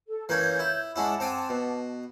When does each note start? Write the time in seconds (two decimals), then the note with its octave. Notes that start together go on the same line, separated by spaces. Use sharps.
0.08 A4
0.29 E3 A#3 C#4 C#5 G6 G#6
0.60 E4
0.96 G#3 C#4 E4 F#5 A5 D6
1.20 C4 G5 G#5
1.49 B2